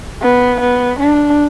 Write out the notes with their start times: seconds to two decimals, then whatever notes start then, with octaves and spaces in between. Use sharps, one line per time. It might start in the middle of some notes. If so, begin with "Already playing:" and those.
0.22 B3
0.61 B3
0.99 D4